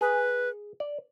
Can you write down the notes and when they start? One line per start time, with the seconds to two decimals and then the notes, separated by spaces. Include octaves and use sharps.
0.01 G#4 B4
0.80 D5